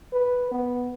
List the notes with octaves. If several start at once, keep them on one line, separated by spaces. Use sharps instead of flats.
B4
B3